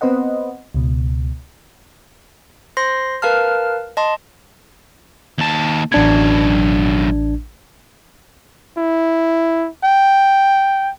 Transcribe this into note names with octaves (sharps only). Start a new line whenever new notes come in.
B3 C4 B4 C5 D#5 F#5
C#2 B2
C5 C6 A#6 C7
A#4 B4 F5 A5 F6
D#5 A5 C6
D#2 A5
A1 F#2 B2 D4 G#6
E4
G5